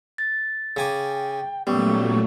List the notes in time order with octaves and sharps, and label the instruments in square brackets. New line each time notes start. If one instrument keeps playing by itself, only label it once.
[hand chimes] A6
[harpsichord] C#3 G#5 D6 [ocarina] G5
[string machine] A#2 F#3 A3 [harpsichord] G3 [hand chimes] B3 C#4 [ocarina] C#6